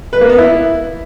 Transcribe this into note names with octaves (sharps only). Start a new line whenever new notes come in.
B4
A#3
B3
E4